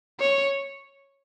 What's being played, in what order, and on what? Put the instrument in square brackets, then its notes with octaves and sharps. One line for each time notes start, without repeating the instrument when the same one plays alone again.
[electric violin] C#5